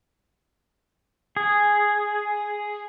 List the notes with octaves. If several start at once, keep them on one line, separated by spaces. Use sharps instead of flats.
G#4